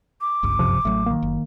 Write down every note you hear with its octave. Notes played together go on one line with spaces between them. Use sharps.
D6
G1 C#2 G2
F#2 C3 F3
A1 F#3 A3
D#3 A#3
F#1